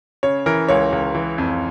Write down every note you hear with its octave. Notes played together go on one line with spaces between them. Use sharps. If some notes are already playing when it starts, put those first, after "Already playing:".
C#3 C#5
E3 A#4
C#2 C#5
C#2
E3
F2